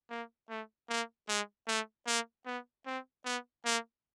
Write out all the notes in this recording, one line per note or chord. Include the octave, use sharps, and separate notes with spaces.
A#3
A3
A#3
G#3
A3
A#3
B3
C4
B3
A#3